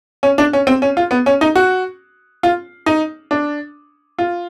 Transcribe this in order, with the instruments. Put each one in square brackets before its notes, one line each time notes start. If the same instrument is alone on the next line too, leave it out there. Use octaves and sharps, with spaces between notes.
[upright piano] C#4
D4
C#4
C4
C#4
F4
B3
C#4
D#4
F#4
F4
D#4
D4
F4